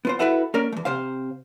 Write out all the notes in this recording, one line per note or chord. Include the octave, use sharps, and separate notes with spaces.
B3 F4 C5
E4 F#4 A4 B4 E5 F#5
A#3 C#4 A#4 D5
E2 A3
C3 C5 F5